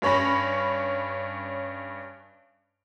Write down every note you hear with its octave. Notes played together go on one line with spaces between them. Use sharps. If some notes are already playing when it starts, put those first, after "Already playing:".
G2 C#4 C#5 B5 A#6